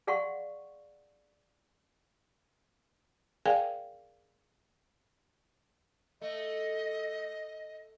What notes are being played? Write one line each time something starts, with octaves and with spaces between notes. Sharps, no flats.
G#4 D5 F5 F#5 C6 C#6
G#4 A#4 D5 F5 G5 G#5
A3 D#5